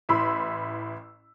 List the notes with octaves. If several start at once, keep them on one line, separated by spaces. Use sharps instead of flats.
A1 E4 B5 C6 E6